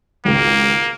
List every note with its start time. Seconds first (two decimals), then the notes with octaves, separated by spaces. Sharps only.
0.25 G#1 C#2 A#3